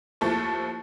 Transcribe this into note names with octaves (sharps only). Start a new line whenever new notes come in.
D#2 F3 A3 E4 A5 C#6